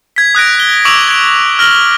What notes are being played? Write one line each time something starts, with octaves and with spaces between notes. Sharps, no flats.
G#6 B6
D#6 F#6 A#6 D7
G7
C#6 D6 E6 D7 F7 F#7
G#6 D7
F6 A#6 F#7 G7